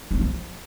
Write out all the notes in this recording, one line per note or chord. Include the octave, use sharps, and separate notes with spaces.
D#4
D4
F3